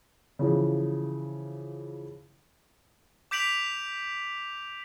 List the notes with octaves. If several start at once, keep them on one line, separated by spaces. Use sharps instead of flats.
C#3 E3 F3
D6 G6 B6 D7 F7 F#7